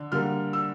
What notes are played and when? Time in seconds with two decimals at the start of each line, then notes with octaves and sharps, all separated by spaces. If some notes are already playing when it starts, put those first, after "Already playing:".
Already playing: D3
0.12 D3 G3 A#3 F6
0.53 E6